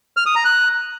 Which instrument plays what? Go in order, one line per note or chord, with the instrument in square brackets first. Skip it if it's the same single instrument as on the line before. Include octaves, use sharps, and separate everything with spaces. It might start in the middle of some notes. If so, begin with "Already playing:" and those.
[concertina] F6
D#6
A#5
F#6